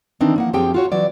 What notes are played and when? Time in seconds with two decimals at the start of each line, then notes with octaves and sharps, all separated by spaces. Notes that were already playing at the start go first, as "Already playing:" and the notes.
0.21 D#3 E3 C4 D4 D#4
0.36 F3 A#3 F#5
0.53 F#2 F3 C4 G4 G#4 G5
0.74 F4 F#4 C#5
0.92 E3 F#3 D5